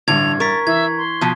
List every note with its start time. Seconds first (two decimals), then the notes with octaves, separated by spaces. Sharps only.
0.08 A1 G2 D3 G#6 F7
0.40 A#4 C#6 A6 B6
0.67 E3 E5 G#6
0.98 C6
1.21 B2 F3